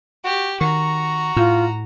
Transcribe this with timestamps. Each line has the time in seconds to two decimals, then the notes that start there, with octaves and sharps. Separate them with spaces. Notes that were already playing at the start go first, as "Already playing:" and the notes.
0.24 F#4 G4
0.61 D#3 F#4 A#5 C#6
1.36 A2 F4